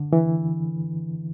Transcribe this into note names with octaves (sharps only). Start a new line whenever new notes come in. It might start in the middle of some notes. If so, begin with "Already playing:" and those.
Already playing: D3
E3